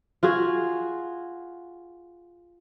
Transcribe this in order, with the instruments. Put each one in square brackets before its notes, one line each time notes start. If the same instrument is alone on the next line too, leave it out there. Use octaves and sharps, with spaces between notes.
[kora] F4 F#4 G#4